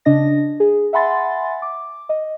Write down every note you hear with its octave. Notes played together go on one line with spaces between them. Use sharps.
C#3 D4 D#5 A#6
G#4
E5 F#5 G#5 B5 C6 A6
D6
D#5